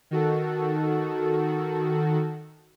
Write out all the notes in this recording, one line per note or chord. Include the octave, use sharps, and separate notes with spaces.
D#3 F#4 A4